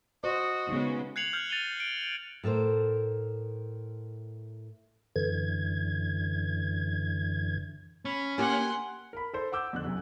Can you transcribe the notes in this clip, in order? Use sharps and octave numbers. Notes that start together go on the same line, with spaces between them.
F#4 C5 D#5
C#3 G#3 B3 D#4
F#6 G#6 C7 C#7 F7 F#7
F6 G6
A6 D#7 F7 G7
D7
A2 A4 A#4 C5
F#2 D3 E3 G#6
C#4 B5
A#3 G4 F#5 G#5 C6
A#4 B5
A4 C5
F#5 D6 E6 G6
F2 D3 F#6
B1 F#2 C3